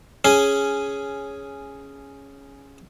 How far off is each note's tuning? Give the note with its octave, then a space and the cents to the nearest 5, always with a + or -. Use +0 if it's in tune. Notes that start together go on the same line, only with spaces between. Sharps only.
C#4 +0 G#4 +0